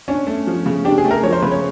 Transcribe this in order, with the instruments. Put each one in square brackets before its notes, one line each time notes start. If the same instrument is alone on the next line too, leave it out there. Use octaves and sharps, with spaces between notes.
[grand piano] C#4 [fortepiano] D4
[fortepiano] A3
F3
C#3
[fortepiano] D4 [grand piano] G4
[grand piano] G#4
[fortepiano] A3
[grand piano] A#4
[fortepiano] F3 [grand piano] C#5
[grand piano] C5
[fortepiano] C#3 [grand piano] B4
[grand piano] C#5